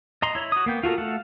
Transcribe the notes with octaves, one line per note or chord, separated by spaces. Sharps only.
D#5 A#5 C6
E4 C#5
F#4 D#6
A#3 B3 G5
F4 F#4 A4 A#4
A3 A4 F5 F#5